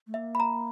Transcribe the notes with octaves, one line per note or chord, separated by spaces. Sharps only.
A3
A#3 E5
B5
A#5